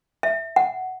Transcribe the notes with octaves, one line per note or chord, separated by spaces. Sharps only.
E5
F#5